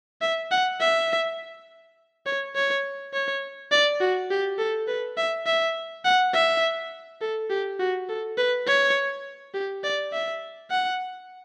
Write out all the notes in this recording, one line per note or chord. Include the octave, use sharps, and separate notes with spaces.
E5
F#5
E5
C#5
C#5
C#5
D5
F#4
G4
A4
B4
E5
E5
F#5
E5
A4
G4
F#4
A4
B4
C#5
G4
D5
E5
F#5